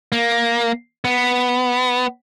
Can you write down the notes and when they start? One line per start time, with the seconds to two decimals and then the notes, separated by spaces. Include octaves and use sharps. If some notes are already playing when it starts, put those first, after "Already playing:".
0.12 A#3
1.05 B3